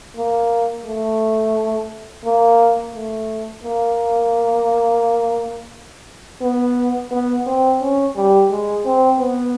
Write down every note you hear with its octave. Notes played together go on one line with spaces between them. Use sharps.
A#3
A3
A#3
A3
A#3
B3
B3
C4
C#4
G3
G#3
C4
B3